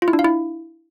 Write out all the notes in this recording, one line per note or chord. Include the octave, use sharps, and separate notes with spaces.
F4
E4
D4
F5
E4